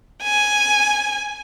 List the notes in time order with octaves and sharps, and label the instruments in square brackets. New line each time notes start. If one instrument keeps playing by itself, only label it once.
[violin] G#5